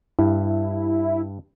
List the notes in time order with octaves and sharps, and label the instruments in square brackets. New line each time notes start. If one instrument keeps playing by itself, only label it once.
[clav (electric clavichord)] G2 [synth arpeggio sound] E4